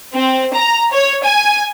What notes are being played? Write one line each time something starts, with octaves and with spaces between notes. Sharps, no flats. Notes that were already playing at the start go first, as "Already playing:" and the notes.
C4
A#5
C#5
G#5